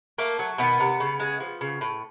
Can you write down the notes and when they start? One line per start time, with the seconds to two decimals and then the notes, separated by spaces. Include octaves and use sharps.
0.18 A3 A#3
0.39 F#3
0.58 B2 D#3 B3
0.80 C3
1.00 C#3
1.20 G#3
1.40 F3
1.61 C#3
1.81 A2